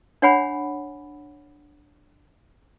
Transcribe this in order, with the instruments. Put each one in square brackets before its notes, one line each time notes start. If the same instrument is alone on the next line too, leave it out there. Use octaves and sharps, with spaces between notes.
[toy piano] D4 C#5 F#5 G#5 B5